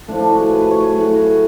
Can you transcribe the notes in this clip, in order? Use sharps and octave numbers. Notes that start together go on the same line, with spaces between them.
A2 F3 D4
D4
F#4
G#4
B4
B4
C#5
B4
A2 F#3 G#4
F#4
G#4